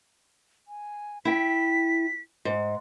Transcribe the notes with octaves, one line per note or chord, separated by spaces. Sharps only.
G#5
E4 G5 B6
G#2